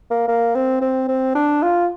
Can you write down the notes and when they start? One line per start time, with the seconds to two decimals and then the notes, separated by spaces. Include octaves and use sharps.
0.11 A#3
0.28 A#3
0.55 C4
0.81 C4
1.08 C4
1.35 D4
1.63 F4